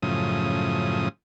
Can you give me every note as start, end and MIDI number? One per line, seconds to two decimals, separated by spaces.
0.02 1.09 42
0.02 1.09 45
0.02 1.09 49
0.02 1.09 53
0.02 1.09 87